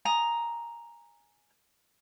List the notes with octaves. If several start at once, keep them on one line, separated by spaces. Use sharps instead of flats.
G#5 A#5 D#6